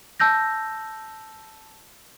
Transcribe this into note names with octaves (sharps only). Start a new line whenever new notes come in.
A5 E6 G6 A#6